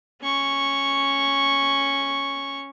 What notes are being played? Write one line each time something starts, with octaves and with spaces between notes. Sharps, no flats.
C#4 C#6